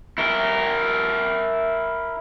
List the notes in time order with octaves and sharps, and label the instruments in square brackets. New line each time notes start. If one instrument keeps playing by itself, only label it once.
[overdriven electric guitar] E4 A#4